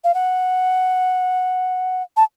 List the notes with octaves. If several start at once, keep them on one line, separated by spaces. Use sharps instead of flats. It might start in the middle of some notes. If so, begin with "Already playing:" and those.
F5
F#5
A5